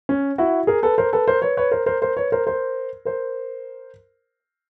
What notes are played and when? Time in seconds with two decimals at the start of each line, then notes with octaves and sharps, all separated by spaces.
0.09 C#4
0.38 E4 F#4
0.67 G#4 A#4
0.83 A4 B4
0.98 A#4 C5
1.13 A4 B4
1.28 A#4 C5
1.42 B4 C#5
1.57 B4 C#5
1.71 A#4 C5
1.86 A#4 C5
2.02 A#4 C5
2.17 B4 C#5
2.32 A#4 C5
2.47 A#4 C5
3.05 A#4 C5